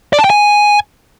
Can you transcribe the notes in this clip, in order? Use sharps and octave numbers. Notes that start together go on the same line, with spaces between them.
D5
A5
G5
G#5